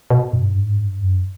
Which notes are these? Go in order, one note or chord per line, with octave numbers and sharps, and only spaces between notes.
B2
G2
G#2
G2
F#2